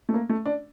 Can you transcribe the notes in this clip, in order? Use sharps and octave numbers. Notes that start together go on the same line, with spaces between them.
A3
A#3
A3
D4